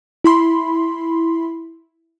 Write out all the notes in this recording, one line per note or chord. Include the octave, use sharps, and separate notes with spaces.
E4 B5 C6